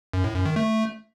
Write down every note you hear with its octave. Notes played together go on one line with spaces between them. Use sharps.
F#2
A2
F#2
D#3
A3